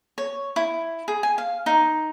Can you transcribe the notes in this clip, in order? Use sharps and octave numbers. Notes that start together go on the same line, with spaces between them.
C#5
E4
G#4
G#5
F5
D#4